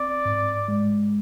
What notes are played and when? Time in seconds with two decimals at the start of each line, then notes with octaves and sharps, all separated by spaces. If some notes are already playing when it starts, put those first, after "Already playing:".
Already playing: C4 D5
0.25 G#2
0.68 G#3